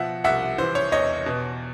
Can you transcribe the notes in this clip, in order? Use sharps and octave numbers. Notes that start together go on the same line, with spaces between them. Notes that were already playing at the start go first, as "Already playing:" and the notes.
Already playing: B2 F3 E5 F#5
C2 E5 F#5
E3 C5
C#5
E2 C#5 D#5
B2